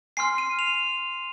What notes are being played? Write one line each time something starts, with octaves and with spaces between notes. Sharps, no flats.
G#5 C6 F6 C7
D#7
F7